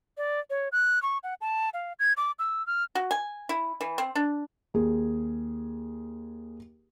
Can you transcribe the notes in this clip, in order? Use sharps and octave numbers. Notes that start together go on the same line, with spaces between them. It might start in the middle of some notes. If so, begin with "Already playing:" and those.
D5
C#5
F#6
C#6
F#5
A5
F5
G#6
D6
E6
F6
F#4
G#5
E4
E3
C4
D4
D#2 G#4